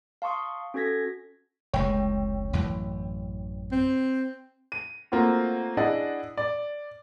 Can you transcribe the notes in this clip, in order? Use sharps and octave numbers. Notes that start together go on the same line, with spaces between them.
F5 A5 C6 C#6 D#6
C#4 F#4 A4 G#6 A#6 B6
F1 C#2 G#3 C#5 G5
A1 F#2 E3
C4
D#7
A3 A#3 C4 F4 F#4
D4 E4 G#4 D5 D#5 F#5
D5